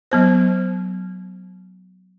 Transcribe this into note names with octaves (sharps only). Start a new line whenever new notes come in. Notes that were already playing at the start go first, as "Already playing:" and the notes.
F#3 B3 C5